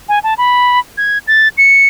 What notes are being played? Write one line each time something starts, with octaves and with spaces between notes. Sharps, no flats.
G#5
A5
B5
G#6
A6
C#7